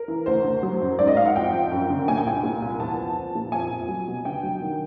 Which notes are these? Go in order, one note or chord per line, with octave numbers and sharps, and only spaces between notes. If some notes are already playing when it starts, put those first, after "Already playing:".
Already playing: A#4
E3
D2 C5
D2
F#3
F#2
G#2 D5
D#5
G#2 F5
F#5
F2 G5
F3
F#2
D3
A#2 G#5
G5
C2 G#5
A#2
C2
E2 A5
F3
F3
A#2
F2 G#5
F2
F#3
B2
D3 G5
F#3
D#3